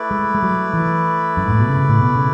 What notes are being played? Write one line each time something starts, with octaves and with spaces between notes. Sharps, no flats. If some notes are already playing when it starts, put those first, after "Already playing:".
Already playing: A3 E4 B4 D5
G#3
G#3
F#3
E3
F#2
G#2
A2
B2
C#3
A2
B2
C#3